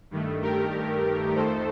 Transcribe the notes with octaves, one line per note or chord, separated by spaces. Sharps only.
G2 D#3 A3
G4 A#4
F2 D#3 A3 A4 C5